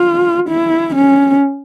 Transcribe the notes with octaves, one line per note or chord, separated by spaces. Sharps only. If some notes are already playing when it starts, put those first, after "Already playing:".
Already playing: F4
E4
C#4